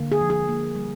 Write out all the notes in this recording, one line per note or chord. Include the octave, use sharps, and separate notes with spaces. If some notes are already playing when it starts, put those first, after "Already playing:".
Already playing: D3 A#3
G#4
F3
G#4
A#3
G3